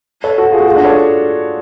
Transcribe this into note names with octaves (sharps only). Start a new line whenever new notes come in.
A4 C#5
F#4 A4
F4 G#4
F#4
F4 G#4
D4 F#4
A4 C#5